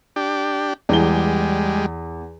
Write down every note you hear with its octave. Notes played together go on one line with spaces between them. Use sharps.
D4 G4
E2 G3 G#3 G7